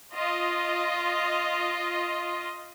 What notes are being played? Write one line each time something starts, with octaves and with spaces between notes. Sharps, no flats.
F4 D#5